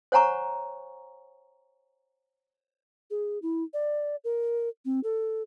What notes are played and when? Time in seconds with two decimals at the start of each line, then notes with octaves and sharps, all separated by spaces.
0.12 C5 C#5 F#5 G#5 A#5 C#6
3.11 G#4
3.42 E4
3.74 D5
4.24 A#4
4.85 C4
5.04 A4